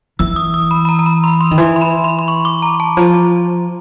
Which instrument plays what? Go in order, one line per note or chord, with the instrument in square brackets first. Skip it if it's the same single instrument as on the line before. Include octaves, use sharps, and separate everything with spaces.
[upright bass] E3 [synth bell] E6
[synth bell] D#6
D#6
B5
B5
A#5
A#5
B5
C6
C6
[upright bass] D#3
E3
[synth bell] C6
B5
C6
C6
C#6
D6
A#5
A5
[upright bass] F3 [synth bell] A#5